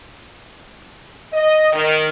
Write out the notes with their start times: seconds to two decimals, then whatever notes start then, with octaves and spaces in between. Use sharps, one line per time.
1.34 D#5
1.73 D#3